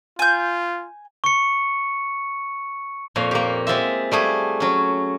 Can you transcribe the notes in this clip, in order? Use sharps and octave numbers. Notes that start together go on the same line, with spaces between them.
F4 G#5 G6
C#6 C#7
F2 A#2 C#5 F5
A#3 G4
G#3 C4 F4 E5
G3 A3 G#4
F#3 C#4